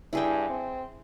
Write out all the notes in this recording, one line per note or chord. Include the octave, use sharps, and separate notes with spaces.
G2 E4 G#4 G5
C4